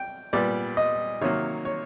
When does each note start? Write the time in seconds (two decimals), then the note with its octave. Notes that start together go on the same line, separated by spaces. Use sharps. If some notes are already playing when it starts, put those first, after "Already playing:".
Already playing: G5
0.33 A#2 G3 B3 D5
0.77 D#5
1.21 C3 D#3 F#3 A#3 C#5
1.65 C#5